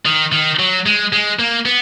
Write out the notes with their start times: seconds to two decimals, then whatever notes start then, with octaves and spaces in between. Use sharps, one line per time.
0.06 D#3
0.32 D#3
0.59 F#3
0.86 G#3
1.13 G#3
1.39 A#3
1.66 B3